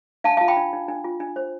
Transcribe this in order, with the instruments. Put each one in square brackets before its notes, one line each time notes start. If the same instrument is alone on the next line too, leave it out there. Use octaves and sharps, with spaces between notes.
[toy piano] D4 F5 A5
F5 A5
F4
G5 B5
D4
D4
D4
F4
D4
C5